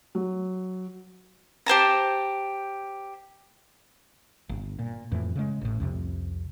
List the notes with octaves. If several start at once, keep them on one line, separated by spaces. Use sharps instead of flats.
F#3
G4 C5 A5 A#5
G1
A#2
F2 A2 E3
C#3 G#3
A1 A2
C2 F2 C3